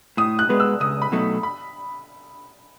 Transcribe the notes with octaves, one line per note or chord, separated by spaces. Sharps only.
A2 D#6
F#6
G#3 B3 F#4 B4
E6
C#2 D#6
B5
B2 F#3 A3 D#4
B5